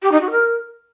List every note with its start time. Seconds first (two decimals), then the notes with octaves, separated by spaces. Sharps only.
0.02 G4
0.12 D#4
0.21 F#4
0.30 A#4